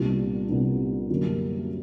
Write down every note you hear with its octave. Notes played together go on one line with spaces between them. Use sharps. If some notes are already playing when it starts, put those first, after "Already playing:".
Already playing: C2 A#2 G3 B3 D4
C2 A#2 G3 B3 D4
F#2 D3 G3 A#3